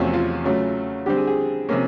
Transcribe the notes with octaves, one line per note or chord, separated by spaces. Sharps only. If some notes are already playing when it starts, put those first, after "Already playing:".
Already playing: E2 C3 F3 A3 C#4 F#4
F4
C#3 F#3 A3
D3 G3 C4 G4
G#4
G#4
C3 F3 A#3 C#4